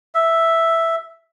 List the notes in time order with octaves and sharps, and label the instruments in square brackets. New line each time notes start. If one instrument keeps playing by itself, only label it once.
[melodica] E5